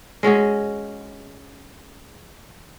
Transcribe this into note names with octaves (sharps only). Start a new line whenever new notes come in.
G#3 C#4 F#4 G#4